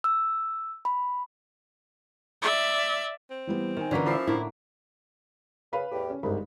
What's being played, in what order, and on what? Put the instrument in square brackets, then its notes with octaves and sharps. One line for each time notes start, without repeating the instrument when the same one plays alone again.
[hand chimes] E6
B5
[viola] D5 E5
[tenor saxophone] C4
[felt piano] E3 G3 B3
[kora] D#3 [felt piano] D#4 G#5
[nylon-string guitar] D3 E3 [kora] A#3 C#4 G#4 [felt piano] D4 F4 B6
[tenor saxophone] F3 [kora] A4 E5 [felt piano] B5 D6 C7
[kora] A2 D3 A#3 [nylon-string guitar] E4
[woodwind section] C#3 [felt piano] B4 F5 B5
[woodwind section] E2 A2 G4
[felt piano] C#4
[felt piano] G1 G#2 B5 [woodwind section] C2